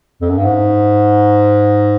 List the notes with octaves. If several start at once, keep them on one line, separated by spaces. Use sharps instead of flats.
F2
F#2
G2
G#2